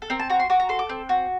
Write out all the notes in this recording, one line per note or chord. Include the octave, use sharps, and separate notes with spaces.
A4
C4 A#4
A5
F#4 A#5
C6
F#4 D6
A#5
A4 C6
D6
C4
F#4